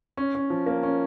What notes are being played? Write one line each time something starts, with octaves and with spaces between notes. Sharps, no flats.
C#4
C#4
F3
A#3
C#4